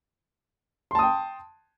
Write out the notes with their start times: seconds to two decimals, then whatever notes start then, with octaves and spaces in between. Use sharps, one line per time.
0.91 C6
0.95 A5
0.99 D#6
1.03 G5